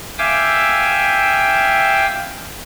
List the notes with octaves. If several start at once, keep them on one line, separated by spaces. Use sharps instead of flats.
E5 F5 G5 G#5 D6 E6